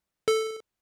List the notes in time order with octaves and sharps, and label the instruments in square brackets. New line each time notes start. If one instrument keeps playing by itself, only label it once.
[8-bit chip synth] A4